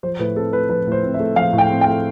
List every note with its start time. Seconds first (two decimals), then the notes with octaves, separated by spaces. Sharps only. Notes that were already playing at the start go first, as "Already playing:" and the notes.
0.03 F3 C5
0.19 A2 B4
0.36 C4 A4
0.53 A3 B4
0.69 F3 B4
0.87 A2
0.92 C5
1.03 C4
1.14 E5
1.20 A3
1.36 F3 F5
1.53 A2
1.58 G5
1.70 C4
1.81 G5
1.87 A3